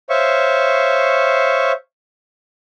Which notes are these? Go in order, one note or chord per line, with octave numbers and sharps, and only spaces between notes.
C5 C#5 E5 F5 C#6